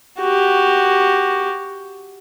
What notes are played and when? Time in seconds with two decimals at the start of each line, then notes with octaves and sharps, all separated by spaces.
0.18 F#4 G4